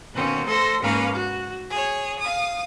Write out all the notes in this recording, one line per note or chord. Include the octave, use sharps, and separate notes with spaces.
B2 D#3 A#3 C4 C#4
A3 A4 C5 C6 A#6
G#2 A#3 C#4 A#4 B4 F5
F#4
G#4 C#5
F5 D#6